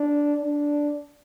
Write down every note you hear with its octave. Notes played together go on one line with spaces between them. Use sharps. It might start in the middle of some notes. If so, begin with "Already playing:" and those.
Already playing: D4
D4